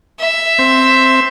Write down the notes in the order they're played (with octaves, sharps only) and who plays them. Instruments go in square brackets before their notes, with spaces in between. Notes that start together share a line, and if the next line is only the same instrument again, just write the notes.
[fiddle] E5
[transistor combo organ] C4